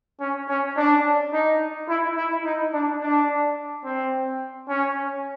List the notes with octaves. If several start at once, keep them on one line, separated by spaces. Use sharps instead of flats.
C#4
C#4
D4
D#4
E4
E4
D#4
D4
D4
C4
C#4